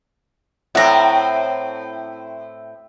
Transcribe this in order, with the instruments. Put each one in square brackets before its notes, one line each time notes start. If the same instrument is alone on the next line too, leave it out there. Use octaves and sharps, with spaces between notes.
[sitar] A2 C4 [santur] E5 [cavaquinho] F#5 A#5